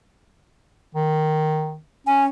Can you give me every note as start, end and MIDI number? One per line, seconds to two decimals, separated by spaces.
0.95 1.77 51
2.07 2.29 61
2.07 2.25 80